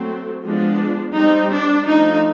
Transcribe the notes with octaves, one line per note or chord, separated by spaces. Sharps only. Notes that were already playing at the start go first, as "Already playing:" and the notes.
Already playing: F#3 A3 C4
F3 G#3 B3 D4
G3 C4 D#4
D4
F3 A3 D4 D#4